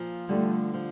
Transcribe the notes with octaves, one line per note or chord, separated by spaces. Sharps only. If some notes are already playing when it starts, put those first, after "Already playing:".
Already playing: A#2 F3
D3 G3 A3
F3